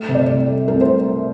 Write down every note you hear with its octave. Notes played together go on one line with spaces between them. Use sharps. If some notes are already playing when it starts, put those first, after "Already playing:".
Already playing: A3
C3
D5
C2
A3
C2 A#4
C5